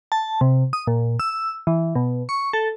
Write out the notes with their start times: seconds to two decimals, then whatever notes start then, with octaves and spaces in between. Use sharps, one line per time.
0.12 A5
0.41 C3
0.73 D#6
0.87 A#2
1.20 E6
1.67 E3
1.95 B2
2.29 C#6
2.53 A4